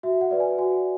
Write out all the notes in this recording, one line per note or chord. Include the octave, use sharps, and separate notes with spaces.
F#4 E5
F#5
B4 D5
G#5
F#4 G#5